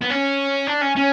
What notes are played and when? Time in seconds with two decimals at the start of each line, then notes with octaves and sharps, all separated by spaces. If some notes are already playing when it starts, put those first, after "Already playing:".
0.01 B3
0.10 C#4
0.67 D4
0.81 C#4
0.96 C#4